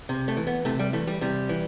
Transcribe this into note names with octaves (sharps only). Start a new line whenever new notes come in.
C3
A3
E3
B3
C3 A3
G3
E3 A3
G3
C3 G3
E3